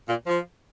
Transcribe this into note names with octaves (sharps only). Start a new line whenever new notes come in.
A#2
F3